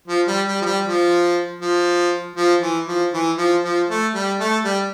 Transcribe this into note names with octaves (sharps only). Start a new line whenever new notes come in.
F3
G3
G3
F3
G3
F3
F3
F3
E3
F3
E3
F3
F3
A3
G3
A3
G3